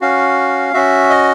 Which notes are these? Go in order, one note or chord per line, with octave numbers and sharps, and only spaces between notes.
C#4 F#4 F5
C#4 F#4 E5
D#5